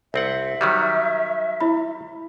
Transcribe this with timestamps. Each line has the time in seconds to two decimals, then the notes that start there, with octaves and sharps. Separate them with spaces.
0.14 C2 C4 E5 F#5
0.61 D#3 F#3 G3
1.61 E4 B5